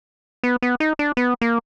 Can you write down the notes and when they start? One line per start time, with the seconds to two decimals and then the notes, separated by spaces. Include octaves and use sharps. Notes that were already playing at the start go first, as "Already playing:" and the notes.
0.44 B3
0.62 B3
0.80 D#4
0.99 D4
1.17 B3
1.41 A#3